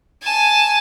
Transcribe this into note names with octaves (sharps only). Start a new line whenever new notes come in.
G#5 A5